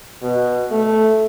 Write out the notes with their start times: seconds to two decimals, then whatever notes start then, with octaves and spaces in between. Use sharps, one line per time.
0.22 B2
0.71 A3